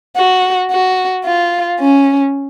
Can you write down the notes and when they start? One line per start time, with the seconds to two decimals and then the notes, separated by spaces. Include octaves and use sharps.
0.16 F#4
0.71 F#4
1.26 F4
1.80 C#4